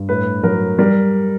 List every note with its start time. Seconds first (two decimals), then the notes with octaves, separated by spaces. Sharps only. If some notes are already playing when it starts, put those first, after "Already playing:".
Already playing: G2
0.09 A2 B4
0.44 F#3 A#4
0.79 G3 A#4